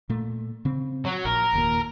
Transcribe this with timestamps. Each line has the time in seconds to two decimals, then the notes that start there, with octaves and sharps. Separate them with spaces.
0.09 A#2 A3
0.65 C#3 C4
1.05 F#3
1.25 A#1 A#4
1.53 F1 D#2 A#2